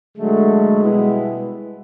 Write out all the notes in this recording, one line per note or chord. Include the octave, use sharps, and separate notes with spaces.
D3 F#3 G#3 A3
B2 G3 B3 E4